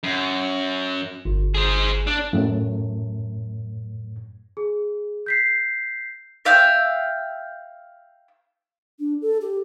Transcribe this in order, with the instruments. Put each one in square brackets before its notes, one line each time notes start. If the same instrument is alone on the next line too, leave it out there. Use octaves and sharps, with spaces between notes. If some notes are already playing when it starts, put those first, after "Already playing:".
[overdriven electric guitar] F#2
[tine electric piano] G1
[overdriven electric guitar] G#4 C5
D4
[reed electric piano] F#2 A2
[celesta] G#4
G6 B6 C7
[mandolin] E5 F5 G5 E6
[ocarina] D4
A4
G4